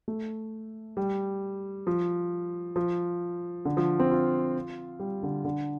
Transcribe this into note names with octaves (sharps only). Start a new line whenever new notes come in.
A3
G3
F3
F3
D3
F3
C4
F4
G3
D3
D3